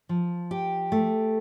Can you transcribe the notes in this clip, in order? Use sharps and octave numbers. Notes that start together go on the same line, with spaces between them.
F3
G4
A3